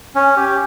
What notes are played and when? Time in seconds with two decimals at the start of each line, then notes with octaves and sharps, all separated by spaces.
0.15 C#4
0.37 G4